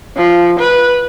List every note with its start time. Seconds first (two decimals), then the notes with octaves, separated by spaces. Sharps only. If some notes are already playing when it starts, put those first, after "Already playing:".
0.17 F3
0.60 B4